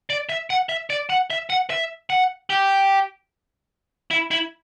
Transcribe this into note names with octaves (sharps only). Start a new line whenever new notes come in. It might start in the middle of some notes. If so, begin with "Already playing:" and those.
D5
E5
F#5
E5
D5
F#5
E5
F#5
E5
F#5
G4
E4
E4